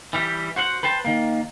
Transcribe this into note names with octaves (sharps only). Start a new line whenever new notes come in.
E3 G3 G4
F#4 C5 F#5
B4 C5 G5 A5
D#3 A#3